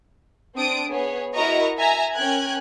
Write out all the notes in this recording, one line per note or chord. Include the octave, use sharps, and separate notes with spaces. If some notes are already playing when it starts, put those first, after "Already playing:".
C4 D4 D#6 D7
B3 G#4 C#5
E4 F#4 A#4 D#5 A#5 C#6
E5 G#5 A#5
C#4 A#4 G5 G#5 F#6 G#6